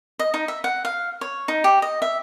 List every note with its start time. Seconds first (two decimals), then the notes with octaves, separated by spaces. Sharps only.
0.19 D#5
0.34 D#4
0.48 E5
0.64 F#5
0.85 F5
1.21 C#5
1.48 D#4
1.64 G4
1.82 D#5
2.02 E5